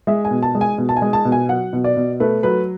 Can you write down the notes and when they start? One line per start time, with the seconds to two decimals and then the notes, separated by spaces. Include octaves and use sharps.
0.07 G#3 E5
0.25 G#5
0.31 B2
0.43 A5
0.55 G#3
0.61 G#5
0.78 B2
0.89 A5
0.96 G#5
1.02 G#3
1.13 A5
1.25 B2
1.32 G#5
1.49 F#3 F#5
1.73 B2
1.84 D5
1.97 B2
2.20 A3 B4
2.43 F#3 B4